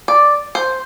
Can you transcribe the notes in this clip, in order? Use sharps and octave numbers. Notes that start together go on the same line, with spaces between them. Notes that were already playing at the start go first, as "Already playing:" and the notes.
D5
C5